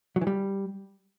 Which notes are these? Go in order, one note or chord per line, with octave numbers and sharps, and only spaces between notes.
F#3
E3
G3